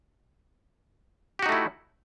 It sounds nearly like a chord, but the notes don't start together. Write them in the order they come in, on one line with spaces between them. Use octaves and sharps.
G4 F#4 D#4 A3 E4